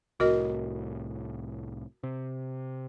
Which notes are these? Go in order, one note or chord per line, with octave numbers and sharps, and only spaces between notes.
C2 A2 F#4 A#4 D#5
C3